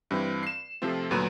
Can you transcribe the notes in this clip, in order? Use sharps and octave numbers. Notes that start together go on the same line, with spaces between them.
G2 E3 C4
C7 E7
C3 F3 A3 C4 F4
D2 A#2 F#3 B3 A#5 D#7